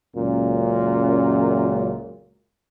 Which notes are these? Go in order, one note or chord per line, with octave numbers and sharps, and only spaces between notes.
C#2 F#2 A#2